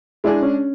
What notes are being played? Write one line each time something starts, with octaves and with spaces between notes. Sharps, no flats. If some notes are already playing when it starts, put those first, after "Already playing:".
G#3 D4 E4 G#4
C#4